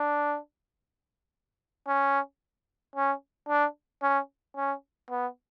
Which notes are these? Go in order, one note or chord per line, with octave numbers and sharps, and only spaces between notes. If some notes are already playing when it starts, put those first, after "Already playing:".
Already playing: D4
C#4
C#4
D4
C#4
C#4
B3